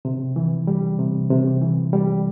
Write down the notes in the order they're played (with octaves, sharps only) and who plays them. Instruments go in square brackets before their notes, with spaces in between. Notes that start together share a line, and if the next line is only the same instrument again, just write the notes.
[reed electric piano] C3
E3
G3
C3
C3
E3
G3